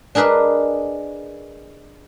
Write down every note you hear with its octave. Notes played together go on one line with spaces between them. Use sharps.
D4 G#4 A#4 B4 D#5